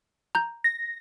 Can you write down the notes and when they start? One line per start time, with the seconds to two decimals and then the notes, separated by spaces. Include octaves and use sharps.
0.35 A#5 G6
0.64 A#6